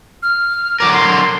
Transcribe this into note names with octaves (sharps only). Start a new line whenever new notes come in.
F6
D3 F#3 A#4 D6
C6